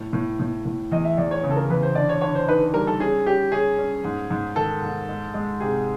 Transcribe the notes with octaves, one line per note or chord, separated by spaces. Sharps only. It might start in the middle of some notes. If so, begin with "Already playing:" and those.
Already playing: A2
A2
A2
A2
E2 D#5
E5
E2 D5
C#5
C#3
A4
A#4
E2 B4
C5
D3 D5
C#5
D3 C#5
C5
D#4 B4
G3 A#4
A4
C#4 G#4
C#4 G4
C#4 G#4
C#4
G#2
G#2
D#3 A4
G#2
G#3
G#3
C3 G#4